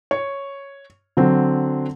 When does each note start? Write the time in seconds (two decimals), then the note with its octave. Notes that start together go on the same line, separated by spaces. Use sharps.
0.11 C#5
1.17 D3 F#3 C4